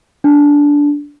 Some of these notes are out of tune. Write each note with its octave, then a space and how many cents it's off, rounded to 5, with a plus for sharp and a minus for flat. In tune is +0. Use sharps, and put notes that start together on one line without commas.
D4 -15